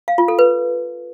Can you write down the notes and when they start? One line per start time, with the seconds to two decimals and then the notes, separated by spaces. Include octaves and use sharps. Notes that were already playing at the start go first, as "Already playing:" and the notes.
0.08 F5
0.18 F4
0.28 A4
0.39 B4